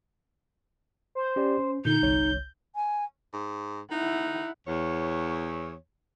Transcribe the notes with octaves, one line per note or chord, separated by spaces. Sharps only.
C5
C#4 G4 D5
C#4
A#2 D3 D#4 G6
G1 C2 C#5
G#5
G#2
D#4 E4 F#5
E2 C#5